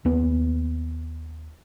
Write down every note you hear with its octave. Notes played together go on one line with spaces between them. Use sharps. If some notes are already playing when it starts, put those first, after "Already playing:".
D#2 B3